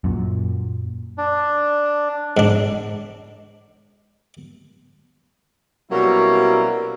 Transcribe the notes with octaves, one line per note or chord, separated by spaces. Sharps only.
F#2 A#2
D4
G#2 D4
B2 F#3 G3 A#3 C#4 E4